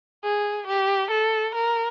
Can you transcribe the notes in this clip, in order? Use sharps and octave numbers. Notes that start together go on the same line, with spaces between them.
G#4
G4
A4
A#4